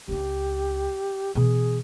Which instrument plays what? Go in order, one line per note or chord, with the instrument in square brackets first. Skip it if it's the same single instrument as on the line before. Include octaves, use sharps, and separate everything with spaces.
[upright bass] C#2 D4 [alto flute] G4
[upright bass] B2 E3 [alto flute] G#4